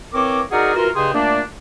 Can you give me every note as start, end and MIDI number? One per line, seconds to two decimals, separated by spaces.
0.13 0.42 52
0.13 0.42 60
0.13 0.42 70
0.13 0.42 73
0.13 0.42 86
0.52 0.72 63
0.52 0.72 66
0.52 0.72 68
0.52 0.72 70
0.52 0.72 74
0.52 0.72 78
0.76 0.89 52
0.76 0.89 65
0.76 0.89 66
0.76 0.89 70
0.95 1.11 43
0.95 1.11 49
0.95 1.11 68
0.95 1.11 75
0.95 1.11 79
0.95 1.11 84
1.13 1.41 46
1.13 1.41 57
1.13 1.41 58
1.13 1.41 62